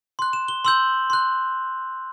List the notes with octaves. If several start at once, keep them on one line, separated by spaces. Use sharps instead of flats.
C6 F#6
E7
G7
C6 E6 G6 F#7
C6 F#6